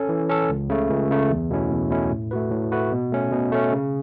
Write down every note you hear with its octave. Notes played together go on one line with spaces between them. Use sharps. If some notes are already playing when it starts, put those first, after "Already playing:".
Already playing: C#4 A4
E3
C#4 A4
C#2
C#3 A3
C#2
C#3 A3
E2
B2 A3 C#4 E4
E2
B2 A3 C#4 E4
A2
A3 F#4 B4
A2
A3 F#4 B4
B2
A3 C#4
B2
A3 C#4
C#3